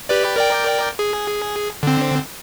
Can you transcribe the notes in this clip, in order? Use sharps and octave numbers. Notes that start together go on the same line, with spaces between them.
G4 B4 D5
A#4 D5 G5
G#4
D3 C4